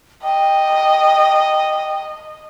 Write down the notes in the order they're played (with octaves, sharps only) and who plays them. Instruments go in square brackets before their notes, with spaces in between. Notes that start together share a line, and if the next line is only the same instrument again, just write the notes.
[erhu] D#5 [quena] G5